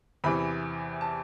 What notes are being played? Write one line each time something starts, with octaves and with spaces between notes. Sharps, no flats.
E2 C3 E3 B5
A5